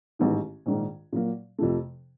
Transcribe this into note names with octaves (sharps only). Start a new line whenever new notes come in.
A1 G#2 D#3
A#1 G#2 D#3
A#2 F#3 A#3
F2 C3 F3 A3